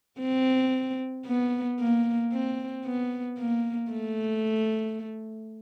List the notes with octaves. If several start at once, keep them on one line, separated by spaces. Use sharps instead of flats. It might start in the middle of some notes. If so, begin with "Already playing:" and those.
C4
B3
A#3
C4
B3
A#3
A3